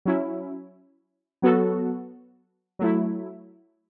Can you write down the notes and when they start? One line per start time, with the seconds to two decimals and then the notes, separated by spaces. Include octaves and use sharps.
0.05 F#3 C#4 E4
1.42 F#3 B3 F#4 A4
2.79 F#3 A3 E4